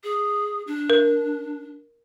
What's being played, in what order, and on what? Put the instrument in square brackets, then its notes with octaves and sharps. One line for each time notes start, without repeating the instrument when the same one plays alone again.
[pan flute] G#4
D4
[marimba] A#4